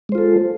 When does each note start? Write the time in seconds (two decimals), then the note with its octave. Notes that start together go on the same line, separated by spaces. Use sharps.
0.09 G#3
0.12 C5
0.15 F4
0.18 A4